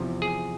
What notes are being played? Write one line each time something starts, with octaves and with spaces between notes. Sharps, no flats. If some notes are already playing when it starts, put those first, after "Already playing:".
Already playing: E2 C3 F3
G#4